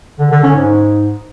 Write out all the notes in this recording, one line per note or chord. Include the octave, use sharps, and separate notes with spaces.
D3
D3
C#4
G#2